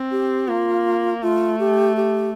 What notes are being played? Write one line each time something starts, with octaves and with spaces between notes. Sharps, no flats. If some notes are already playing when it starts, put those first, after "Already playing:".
Already playing: C4
G4
A#3 F4
A3 F4
G4
G4